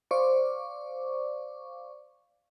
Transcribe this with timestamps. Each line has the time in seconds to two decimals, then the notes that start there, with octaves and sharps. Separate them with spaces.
0.11 C5 D5 F5 C#6 D6